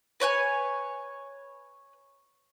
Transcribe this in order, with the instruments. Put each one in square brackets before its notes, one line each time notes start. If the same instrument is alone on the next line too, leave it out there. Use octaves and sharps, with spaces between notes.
[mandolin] B4 C#5 G5 G#5